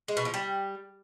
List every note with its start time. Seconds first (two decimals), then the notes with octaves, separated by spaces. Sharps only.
0.08 G#3
0.17 B2
0.25 F3
0.34 G3